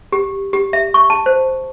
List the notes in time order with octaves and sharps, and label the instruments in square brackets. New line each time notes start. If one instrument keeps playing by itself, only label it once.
[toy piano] G4
G4
E5
C#6
A5
C5